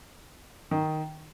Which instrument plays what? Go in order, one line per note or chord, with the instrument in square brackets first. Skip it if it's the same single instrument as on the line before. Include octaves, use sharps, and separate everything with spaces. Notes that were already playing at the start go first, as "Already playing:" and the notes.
[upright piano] D#3